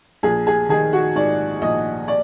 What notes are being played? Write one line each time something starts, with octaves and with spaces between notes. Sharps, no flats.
A#1 G#4
G#4
D#3 G#4
F#4
G#2 D5
A#1 D#5
D5